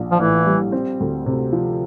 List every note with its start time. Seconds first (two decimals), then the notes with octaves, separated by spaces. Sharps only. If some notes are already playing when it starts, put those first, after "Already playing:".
Already playing: A#1 D4
0.11 F3
0.19 A2 E3
0.46 G3
0.72 C4
1.00 D2
1.26 C3
1.53 F3